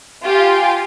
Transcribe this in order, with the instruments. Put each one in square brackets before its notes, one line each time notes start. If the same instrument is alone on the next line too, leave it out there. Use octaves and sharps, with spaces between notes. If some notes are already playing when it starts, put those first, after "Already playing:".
[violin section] F4 G4 G#5